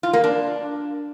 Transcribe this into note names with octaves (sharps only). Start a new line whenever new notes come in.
F4
A#3
D4